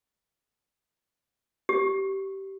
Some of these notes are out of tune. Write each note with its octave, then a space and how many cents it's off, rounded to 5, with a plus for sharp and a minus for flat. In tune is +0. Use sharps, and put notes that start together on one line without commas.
G4 -20